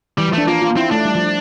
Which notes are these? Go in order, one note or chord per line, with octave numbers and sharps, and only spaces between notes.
E3 G3
F3
A3 D4
A#3 F4
F4
C4 E4
A3 D4
G3
F3